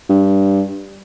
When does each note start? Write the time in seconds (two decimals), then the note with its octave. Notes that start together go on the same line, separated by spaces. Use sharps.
0.09 G2